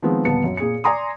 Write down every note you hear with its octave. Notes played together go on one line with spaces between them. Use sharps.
D#3 F3 G#3 B3 C4
G1 D#2 A#2 B3 A5 C#7
F#2
A#2 G#4 C#7
D5 G#5 A#5 C6 D#6